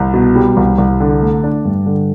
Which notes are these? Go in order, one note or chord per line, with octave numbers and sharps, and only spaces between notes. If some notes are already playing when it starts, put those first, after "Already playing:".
Already playing: C2
B2
G3
C2
C2
D3
A3
D4
G2
D3